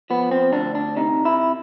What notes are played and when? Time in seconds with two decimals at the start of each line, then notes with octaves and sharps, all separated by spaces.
0.10 F3 B3
0.31 C4
0.52 D2 D4
0.75 D4
0.97 C3 D#4
1.25 E4